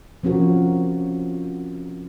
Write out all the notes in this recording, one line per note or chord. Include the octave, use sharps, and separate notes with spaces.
F3 C4 C#4 F#4 A#4